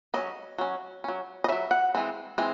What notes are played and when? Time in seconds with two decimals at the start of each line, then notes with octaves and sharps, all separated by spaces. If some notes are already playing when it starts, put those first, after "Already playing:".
0.14 F#3 C#4 D#5
0.58 F#3 C#4
1.04 F#3 C#4
1.44 D#5
1.48 F#3 C#4 E5
1.71 F#5
1.95 E3 G#3 C4
2.38 E3 G#3 C4